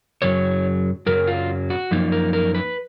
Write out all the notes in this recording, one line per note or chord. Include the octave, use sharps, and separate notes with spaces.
F#2 C#3 F#3 C#5
F#2 C#3 F#3 A#4
F4
F#4
F#2 F3 A#3 D#4
A#4
A#4
B4